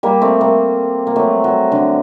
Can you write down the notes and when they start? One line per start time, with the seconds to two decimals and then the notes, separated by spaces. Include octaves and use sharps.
0.03 G3 A#3
0.21 A3 C4
0.41 G3 A#3
1.07 A#3
1.16 F#3 A3
1.44 F#3
1.72 D3